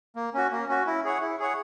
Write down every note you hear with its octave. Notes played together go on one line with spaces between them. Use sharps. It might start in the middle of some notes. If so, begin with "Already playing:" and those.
A#3
C#4 F#4
A#3
C#4 F#4
E4
G#4 C#5 F#5
E4
G#4 C#5 F#5